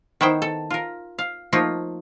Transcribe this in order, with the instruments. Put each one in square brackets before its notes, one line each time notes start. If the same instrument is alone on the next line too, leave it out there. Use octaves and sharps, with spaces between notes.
[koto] D#3 B3 E4 C5 G5
A4
F4 A#4
F5
F3 A3 A#3 D#4 F4